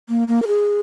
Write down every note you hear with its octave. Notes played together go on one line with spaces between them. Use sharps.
A#3
A#3
A#4
G#4